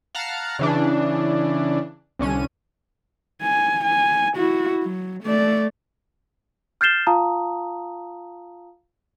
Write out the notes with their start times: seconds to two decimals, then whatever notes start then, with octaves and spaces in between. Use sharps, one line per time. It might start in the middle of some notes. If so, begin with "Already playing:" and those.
0.15 F5 F#5 A5 A#5 F6
0.59 C#3 E3 D4
2.19 C2 D3 C#4 D#7
3.42 G#5
3.84 G#5
4.37 E4 F#4
4.83 F#3
5.24 A3 D5
6.81 F6 G6 A6 C7 E7 G7
7.07 F4 F5 A5 A#5 D#6